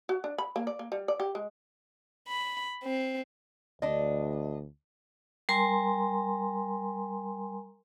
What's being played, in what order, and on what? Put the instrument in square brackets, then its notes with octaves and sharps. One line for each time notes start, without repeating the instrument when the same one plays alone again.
[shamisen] F#4
D4
B5
A#3
D5
A#3
G3
D5
G4
G#3
[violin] B5
C4
[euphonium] D2 [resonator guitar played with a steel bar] D4 D#5
[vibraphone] G3 A#4 G#5 A#5 C6